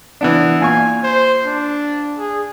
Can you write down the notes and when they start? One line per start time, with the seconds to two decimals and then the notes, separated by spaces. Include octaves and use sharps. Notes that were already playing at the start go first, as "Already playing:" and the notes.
0.21 E3 B3 D4
0.61 A#2 F5 G#5 C#6
1.03 C5
1.45 D4
2.18 G#4